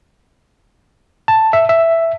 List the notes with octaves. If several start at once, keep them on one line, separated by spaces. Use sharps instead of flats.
A5
E5
E5